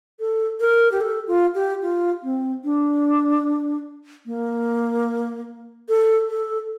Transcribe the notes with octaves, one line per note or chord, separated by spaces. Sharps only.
A4
A#4
G4
A4
F4
G4
F4
C4
D4
A#3
A4
A4